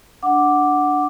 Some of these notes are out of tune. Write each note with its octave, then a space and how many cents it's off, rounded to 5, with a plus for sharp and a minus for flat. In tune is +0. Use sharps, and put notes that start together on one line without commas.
D4 +0 F#5 +0 D6 +0